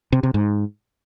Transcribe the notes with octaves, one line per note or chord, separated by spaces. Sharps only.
C3
C3
G#2